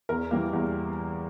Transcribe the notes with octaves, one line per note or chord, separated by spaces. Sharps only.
E2 A#4
E3 G3 A#3
E2